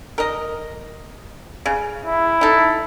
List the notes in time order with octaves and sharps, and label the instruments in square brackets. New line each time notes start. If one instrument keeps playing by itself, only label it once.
[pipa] A#4 D#5
C#3
[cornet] E4
[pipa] D#4 A4